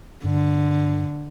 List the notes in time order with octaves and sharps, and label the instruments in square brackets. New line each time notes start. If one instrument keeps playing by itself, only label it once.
[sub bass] G2 [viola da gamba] D3